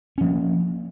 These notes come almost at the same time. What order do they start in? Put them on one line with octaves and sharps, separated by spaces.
C#4 F3 A#3